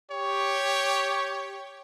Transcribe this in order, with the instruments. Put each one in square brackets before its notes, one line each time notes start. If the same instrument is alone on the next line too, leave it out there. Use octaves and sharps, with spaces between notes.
[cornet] G4 [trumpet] C#5